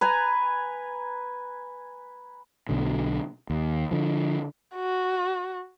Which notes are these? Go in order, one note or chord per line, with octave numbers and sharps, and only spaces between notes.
B4 G#5 A#5
B1 B2 D3
D#2
D3 F3
F#4